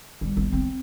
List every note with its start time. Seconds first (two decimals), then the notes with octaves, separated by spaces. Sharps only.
0.21 G3
0.37 B3
0.52 C4